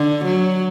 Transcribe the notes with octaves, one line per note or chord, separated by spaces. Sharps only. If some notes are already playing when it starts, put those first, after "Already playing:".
Already playing: D3
F#3